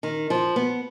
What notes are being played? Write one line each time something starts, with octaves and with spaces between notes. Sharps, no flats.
D#3
F3
B3